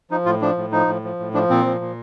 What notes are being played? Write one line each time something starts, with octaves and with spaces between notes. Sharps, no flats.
F3 D#4
A2 F4
F3 D4
A2
F3 D#4
A2
F3
A2
F3 D4
A#2 C4
F3
A#2